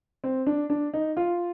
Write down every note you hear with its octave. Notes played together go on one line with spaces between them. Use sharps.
C4
D4
D4
D#4
F4